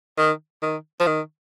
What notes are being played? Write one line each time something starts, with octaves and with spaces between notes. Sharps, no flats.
D#3
D#3
F3
D#3